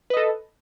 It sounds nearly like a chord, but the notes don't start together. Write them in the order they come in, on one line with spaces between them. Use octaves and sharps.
B4 D#5 A4